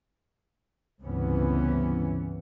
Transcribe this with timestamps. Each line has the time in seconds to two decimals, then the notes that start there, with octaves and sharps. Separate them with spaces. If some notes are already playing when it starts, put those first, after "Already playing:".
1.01 C#2 G2 C3 E3 B3 C#4